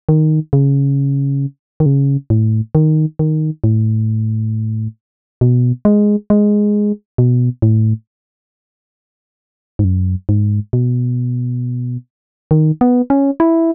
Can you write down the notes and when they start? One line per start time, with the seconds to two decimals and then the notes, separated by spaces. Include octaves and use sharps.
0.09 D#3
0.53 C#3
1.80 D#3
1.86 C#3
2.30 A2
2.75 D#3
3.19 D#3
3.64 A2
5.41 B2
5.85 G#3
6.30 G#3
7.18 B2
7.62 A2
9.79 G#2
9.84 F#2
10.29 G#2
10.73 B2
12.51 D#3
12.81 B3
13.10 C#4
13.40 E4